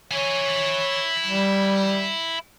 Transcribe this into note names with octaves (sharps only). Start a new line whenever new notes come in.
E4 C#5 G#5
G3